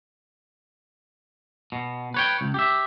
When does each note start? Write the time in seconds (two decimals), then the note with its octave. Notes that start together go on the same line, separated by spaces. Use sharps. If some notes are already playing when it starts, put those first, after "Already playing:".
1.72 B2
2.14 B4 C#5 G5
2.41 C#2
2.54 G4 E5